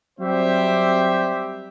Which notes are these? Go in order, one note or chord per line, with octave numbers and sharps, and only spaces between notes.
F#3 G3 C4 G4 C5 E5